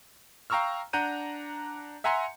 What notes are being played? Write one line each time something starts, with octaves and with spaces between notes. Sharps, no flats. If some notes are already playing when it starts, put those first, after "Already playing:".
F5 G5 A#5 C#6 E6 F6
D4 F#5 A#5 G6 D#7
E5 F#5 G#5 A#5 C6 C#7